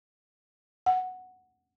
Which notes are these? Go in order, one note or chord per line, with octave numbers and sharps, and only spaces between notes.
F#5